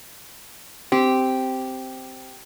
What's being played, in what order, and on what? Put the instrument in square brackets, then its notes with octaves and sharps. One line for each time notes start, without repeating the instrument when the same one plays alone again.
[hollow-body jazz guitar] C4 [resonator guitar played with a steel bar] G4